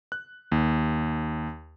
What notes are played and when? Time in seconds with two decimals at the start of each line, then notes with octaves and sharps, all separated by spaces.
0.12 F#6
0.52 D#2